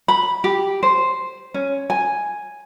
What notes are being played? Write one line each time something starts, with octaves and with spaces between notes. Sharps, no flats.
B5
G4
C5
C#4
G#5